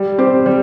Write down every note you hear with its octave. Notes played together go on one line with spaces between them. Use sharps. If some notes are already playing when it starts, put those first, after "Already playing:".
Already playing: G3
C4 G4 C5
G3